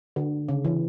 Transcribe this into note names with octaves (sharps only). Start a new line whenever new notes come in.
D3
C#3
E3